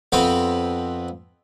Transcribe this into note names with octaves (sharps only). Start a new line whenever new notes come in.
F2 B3 C4 B4 F5 B5